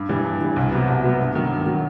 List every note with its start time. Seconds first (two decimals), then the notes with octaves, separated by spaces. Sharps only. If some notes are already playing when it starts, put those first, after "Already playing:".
Already playing: G2
0.09 E3 G3
0.25 G2
0.41 E3 G3
0.56 C2
0.72 C3 F#3 B3
0.88 C2
1.03 C3 F#3 B3
1.20 G2
1.35 D#3 F#3
1.51 G2
1.66 D#3 F#3